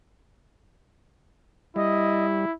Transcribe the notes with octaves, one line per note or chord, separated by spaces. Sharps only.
G3 E4 D#5